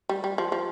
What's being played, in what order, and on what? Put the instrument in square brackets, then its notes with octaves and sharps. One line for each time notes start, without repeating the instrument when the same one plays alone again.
[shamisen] G3
G3
F3
F3